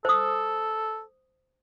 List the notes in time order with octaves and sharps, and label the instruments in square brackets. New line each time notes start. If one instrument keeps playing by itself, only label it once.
[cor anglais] A4 [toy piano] C5 D#6